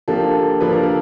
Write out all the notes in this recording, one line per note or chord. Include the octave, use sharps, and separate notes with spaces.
F3 A#3 D4 G4 A4
F3 A#3 D4 B4
A#4
A4